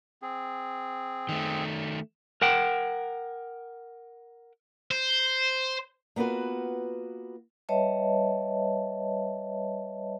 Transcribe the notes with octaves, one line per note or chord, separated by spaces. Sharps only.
C4 G#4
D#3 A3
A#4 F#5 G5
C5
A#3 B3 F4 F#4 B4
G3 B4 C#5 D#5 E5 A5